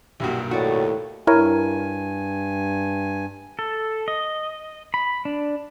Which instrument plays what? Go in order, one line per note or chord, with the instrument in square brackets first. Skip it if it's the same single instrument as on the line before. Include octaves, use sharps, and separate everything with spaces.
[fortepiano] B1 G2 A#2 [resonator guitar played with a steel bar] E4 F#4 [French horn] G4
[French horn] D#2 [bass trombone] A2 [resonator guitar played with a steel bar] F#4 D5
[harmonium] G2 G#5 [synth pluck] E4 A#4 C#5
[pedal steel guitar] A4
D#5
B5
D4